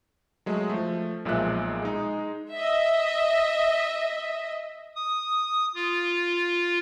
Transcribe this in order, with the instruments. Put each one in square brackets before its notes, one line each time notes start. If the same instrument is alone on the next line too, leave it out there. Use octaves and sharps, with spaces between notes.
[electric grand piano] F#3 G#3 A3
F3 A3
B1 A#2 F3 G#3 E5 F#6
G#3 D#4
[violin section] D#5 E5
[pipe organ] D#6
F4